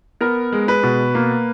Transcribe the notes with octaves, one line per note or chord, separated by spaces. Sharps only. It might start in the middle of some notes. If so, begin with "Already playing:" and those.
B3 A#4
G#3
B4
B2
A#3